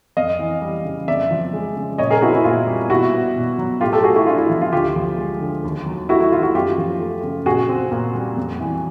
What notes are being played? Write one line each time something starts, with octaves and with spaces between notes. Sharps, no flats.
F2 D#5 F5
E3
G3
C#3
F2 D5 E5
F3
G#3
C#3
A#2 C#5 D#5
G#4 A#4
C4 E4 F#4
E4
A#2 F4
G3
B2 E4 F#4
B3
B2
F#3
A2 F4 G4
G4 A4
A3 F#4 G#4
E4 F#4
D4 F4
E4
F3 F4
F4
D2 F4 G4
F3
G#3
D3
D#2
F#3
A3 E4 F#4
E4
D#3 F4
E4 F#4
F#2 F4 G4
F3
A3
C#3
A#2 F#4 G#4
C4
A#2
G3
F2
E3